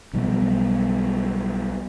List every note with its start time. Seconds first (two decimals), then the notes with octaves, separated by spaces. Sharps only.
0.13 B1 F3 G3 B3